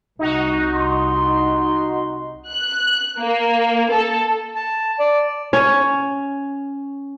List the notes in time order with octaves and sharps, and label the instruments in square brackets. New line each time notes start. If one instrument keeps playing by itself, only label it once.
[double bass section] C2 [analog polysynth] D#4 F#4
[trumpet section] C6
[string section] F#6
A#3
A4
[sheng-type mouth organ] A5
D5
[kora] C#4 C#5